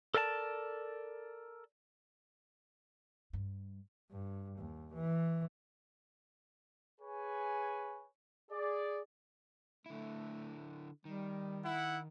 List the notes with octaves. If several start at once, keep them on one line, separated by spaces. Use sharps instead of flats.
A4 A#4 D5 F5 A5
G2
G2
D#2
E3
G#4 B4 C#5 G#5
G#4 D5
D3 A3 E4
D#3 G3
E4 F#5